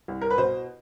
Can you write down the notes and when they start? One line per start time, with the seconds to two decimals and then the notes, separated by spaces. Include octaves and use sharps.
0.08 C2
0.21 A#4
0.30 B4
0.38 B2 C5